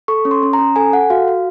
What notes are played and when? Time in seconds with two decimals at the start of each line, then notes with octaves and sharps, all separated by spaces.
0.08 A4 C#6
0.25 C#4
0.31 C6
0.43 C#4
0.53 A#5
0.59 C#4
0.76 A4 G#5
0.93 A4 F#5
1.10 F#4 F5
1.28 F#4